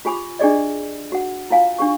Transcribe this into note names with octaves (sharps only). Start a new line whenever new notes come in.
F4 G4 G#5 B5 D6
D4 G4 G#4 D5 D#5
F#4 F#5
E4 F4 F5 G#5
D4 G4 C#6